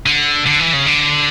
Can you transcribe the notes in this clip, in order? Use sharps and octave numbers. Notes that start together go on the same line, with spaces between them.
D3
D3
E3
C#3
D3